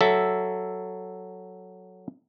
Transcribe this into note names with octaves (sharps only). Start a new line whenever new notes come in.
F#3 A4 E5